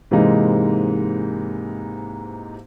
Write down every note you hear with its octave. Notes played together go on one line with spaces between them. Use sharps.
G#2 C3 E3 G#3 A#3 D#4